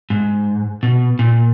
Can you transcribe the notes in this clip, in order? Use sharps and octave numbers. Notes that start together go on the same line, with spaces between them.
G#2
B2
A#2